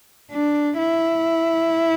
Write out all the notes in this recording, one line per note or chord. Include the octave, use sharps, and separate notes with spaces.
D4
E4